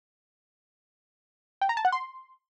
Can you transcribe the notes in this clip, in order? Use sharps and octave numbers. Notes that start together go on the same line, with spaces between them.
G5
A#5
A5
F#5
C6